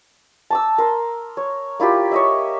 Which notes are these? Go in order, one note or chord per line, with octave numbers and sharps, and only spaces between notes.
A5 D6 E6
A#4 C6
C#5
A#3 E4 F4 G4
C#5 D#5 E5